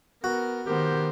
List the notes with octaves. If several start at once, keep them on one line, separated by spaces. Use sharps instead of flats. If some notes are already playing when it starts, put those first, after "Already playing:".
B3 F#4 A#4
D#3 B3 G4 A#4 C5